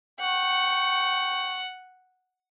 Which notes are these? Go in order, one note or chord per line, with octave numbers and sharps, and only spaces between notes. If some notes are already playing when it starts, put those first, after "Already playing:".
F#5 G5 C#6